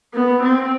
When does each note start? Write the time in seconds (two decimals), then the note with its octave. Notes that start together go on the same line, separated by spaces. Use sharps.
0.14 B3
0.43 C4